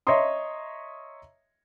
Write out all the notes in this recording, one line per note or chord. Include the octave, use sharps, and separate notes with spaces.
C#5 D#5 E5 A#5 C6 D#6